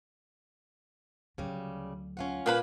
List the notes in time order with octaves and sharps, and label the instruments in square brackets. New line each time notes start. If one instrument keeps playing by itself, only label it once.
[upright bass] D2 F#3 [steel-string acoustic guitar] C#3 G3
[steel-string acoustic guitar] C#4 F4 F#5
[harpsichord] A#2 [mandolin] A#3 B4 B5